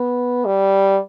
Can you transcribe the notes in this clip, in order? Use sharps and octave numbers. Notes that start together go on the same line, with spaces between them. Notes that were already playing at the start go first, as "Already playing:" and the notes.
Already playing: B3
G3